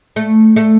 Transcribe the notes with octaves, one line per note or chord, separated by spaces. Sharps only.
A3
A3